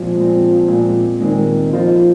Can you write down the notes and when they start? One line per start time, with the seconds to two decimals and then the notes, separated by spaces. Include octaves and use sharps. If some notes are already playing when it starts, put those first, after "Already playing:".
Already playing: A#2 F3 G#3 C4
0.16 A#2 G#3 C4
0.68 A#2 G#3 C4
1.20 A#2 D#3 G#3 C4
1.72 F3 A#3 F4 C5 D#5